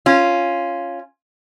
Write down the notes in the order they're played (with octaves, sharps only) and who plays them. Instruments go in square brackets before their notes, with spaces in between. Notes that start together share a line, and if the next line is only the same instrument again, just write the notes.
[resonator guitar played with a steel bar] C#4 F4